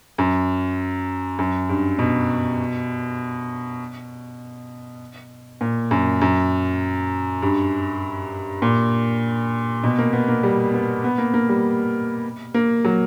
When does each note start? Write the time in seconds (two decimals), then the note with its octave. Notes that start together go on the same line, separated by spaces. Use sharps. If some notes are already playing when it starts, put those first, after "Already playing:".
0.18 F#2
1.39 F#2
1.69 G2
1.99 B2
5.61 A#2
5.91 F#2
6.21 F#2
7.42 G2
8.62 A#2
9.84 B2
9.98 A#3
10.13 B3
10.28 A#3
10.43 G3
10.74 B3
11.04 B3
11.18 A#3
11.34 A#3
11.49 G3
12.54 A#3
12.85 F#3